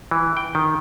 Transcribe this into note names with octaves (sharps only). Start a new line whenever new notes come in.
E3
G5
D#3